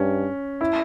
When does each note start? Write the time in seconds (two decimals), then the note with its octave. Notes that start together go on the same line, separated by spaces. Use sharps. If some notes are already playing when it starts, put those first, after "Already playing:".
Already playing: G2 C#4
0.61 E4